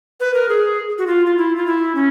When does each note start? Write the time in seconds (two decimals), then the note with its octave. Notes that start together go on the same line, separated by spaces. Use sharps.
0.20 B4
0.34 A#4
0.49 G#4
0.98 F#4
1.07 F4
1.26 F4
1.37 E4
1.56 F4
1.67 E4
1.95 C#4